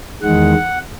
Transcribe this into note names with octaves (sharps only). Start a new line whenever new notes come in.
E2 D#3 G#3 F#5